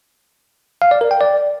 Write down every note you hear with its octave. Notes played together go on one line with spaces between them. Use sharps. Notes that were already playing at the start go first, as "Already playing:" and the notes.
F5
D5
A#4
G5
D5